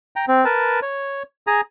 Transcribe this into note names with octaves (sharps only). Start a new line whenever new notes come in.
G5 A#5
C4
A#4 B4 A5
C#5
G#4 G#5 A#5